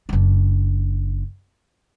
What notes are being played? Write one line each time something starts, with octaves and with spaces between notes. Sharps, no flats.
F#1 D4